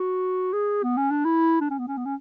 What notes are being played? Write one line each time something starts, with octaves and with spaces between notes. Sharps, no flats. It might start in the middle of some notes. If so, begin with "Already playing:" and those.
Already playing: F#4
G#4
B3
C#4
D4
E4
D4
C#4
B3
C#4
B3
C#4